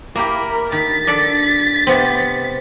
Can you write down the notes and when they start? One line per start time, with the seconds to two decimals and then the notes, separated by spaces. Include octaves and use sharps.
0.16 A#3 E4 G4 A#4 B5
0.72 D#3 A6 B6
1.07 D4 A4 D5
1.87 C3 B3 C4